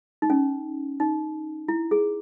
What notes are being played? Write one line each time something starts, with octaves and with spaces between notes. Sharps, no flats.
D#4
C#4
D#4
E4
G#4